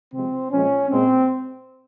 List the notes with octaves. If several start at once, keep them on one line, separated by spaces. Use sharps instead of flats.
C3 F3 G#3 C4
A#2 F3 G#3 C#4
A#2 G#3 C4